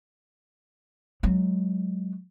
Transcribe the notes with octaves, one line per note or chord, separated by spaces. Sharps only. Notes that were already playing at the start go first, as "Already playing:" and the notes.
F#3 G#3